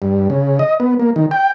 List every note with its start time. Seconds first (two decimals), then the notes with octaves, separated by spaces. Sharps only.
0.02 G2
0.30 C#3
0.59 D#5
0.80 B3
1.00 A#3
1.16 D#3
1.31 G5